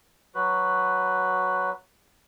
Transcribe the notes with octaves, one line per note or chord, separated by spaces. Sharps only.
F#3 F#4 B4